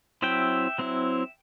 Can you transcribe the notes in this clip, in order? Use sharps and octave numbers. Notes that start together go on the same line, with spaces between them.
F#3 C4 E4 E5 G5
F#3 C4 E4